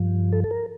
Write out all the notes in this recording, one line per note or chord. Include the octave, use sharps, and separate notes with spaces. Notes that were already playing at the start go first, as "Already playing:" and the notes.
Already playing: G2 F3
A4
A4
A#4